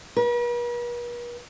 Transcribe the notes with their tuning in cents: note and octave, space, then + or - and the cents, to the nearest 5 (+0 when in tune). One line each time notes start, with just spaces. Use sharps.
B4 -45